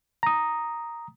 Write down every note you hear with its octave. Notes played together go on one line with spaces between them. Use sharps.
A#5 D#6